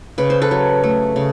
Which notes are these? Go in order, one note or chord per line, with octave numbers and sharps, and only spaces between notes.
C#3 B4
C5
A4 B4
F#3
A3
C#3